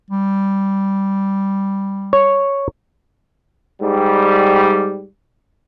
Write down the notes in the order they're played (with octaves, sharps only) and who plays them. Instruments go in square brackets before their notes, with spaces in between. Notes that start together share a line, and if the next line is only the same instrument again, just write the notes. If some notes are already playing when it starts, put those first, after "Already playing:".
[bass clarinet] G3
[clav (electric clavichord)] C#5
[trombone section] G#2 G3